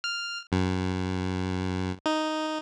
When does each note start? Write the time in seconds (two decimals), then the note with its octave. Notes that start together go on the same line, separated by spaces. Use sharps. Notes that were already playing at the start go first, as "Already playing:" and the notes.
0.04 F6
0.52 F#2
2.06 D#4